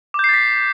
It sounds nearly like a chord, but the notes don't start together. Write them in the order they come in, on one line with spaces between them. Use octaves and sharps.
D6 G6 C7 A6 B6